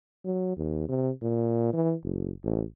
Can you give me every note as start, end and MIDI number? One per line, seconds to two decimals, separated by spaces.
0.25 0.53 54
0.57 0.86 39
0.89 1.10 48
1.22 1.68 46
1.73 1.95 52
2.04 2.31 30
2.44 2.63 33